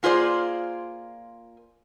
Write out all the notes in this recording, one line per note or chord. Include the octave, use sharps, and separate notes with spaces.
A#3 F4 G#4 C5 D5